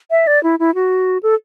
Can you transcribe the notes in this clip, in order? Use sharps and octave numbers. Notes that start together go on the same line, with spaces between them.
E5
D5
E4
E4
F#4
A4